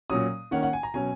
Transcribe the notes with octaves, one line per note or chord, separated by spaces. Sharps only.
A#2 F#3 C#4 D#6
D#3 A#3 C#4 F#5
F#5
G#5
A#5
B2 F#3 C#4 G#5